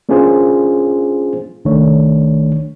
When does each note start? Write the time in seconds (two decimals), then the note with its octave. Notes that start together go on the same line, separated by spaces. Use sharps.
0.09 A#3 C#4 D4 F4 G#4 C5
1.65 C2 D#3 A3 D4 C#5